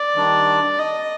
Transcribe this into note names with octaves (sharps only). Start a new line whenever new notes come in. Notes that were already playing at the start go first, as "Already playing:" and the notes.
Already playing: D5
D#3 G3 D4
D#5